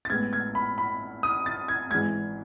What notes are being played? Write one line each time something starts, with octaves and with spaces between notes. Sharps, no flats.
A6
A1 A2 G#3 B3 G#6
G#6
B5
B5
D#6
A6
G#6
G#1 G#2 E3 G#3 G#6